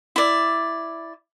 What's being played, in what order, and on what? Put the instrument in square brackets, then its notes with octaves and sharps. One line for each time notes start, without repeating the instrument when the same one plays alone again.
[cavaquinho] E4 D5